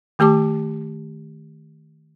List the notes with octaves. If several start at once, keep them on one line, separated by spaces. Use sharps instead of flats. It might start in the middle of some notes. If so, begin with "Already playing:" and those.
D#3 A3 G4 A5 D6